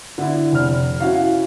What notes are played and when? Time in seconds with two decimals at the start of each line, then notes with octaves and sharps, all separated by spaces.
0.18 D3 E4
0.52 F1 F6
1.00 C#4 E4 F#4 F5